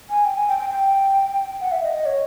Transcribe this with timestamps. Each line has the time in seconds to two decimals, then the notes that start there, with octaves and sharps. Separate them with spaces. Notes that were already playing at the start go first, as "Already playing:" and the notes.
0.10 G#5
0.25 G5
0.36 G#5
0.48 G5
0.59 G5
0.70 G5
1.60 F#5
1.72 E5
1.83 D#5
1.94 D#5
2.06 C#5